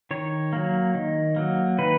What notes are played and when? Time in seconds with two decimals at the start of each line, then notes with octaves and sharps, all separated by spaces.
0.11 D#3 C#5
0.53 F#3 A#3
0.95 D#3
1.36 F#3 A#3
1.79 D#3 B4